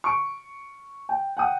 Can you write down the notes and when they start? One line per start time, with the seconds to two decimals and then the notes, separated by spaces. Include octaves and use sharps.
0.04 C#6 D7
1.09 G5
1.37 F#5 G5 D#6